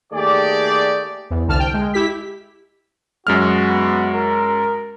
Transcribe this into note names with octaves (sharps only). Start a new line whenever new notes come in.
D#2 A3 G4 G#4 D5
E2
C2 D3 A5 F6
G5
G#3
E4 G4 B6
F#2 G#3 F#4 F6
B3
A#4